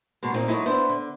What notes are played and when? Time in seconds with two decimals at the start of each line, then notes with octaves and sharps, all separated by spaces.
0.23 B2 D#3 G#3
0.34 A#2 A#3 C4 D#4
0.48 D#3 F#3 G#3 D#4 E4 A4
0.66 B3 D4 E4 C5
0.89 D3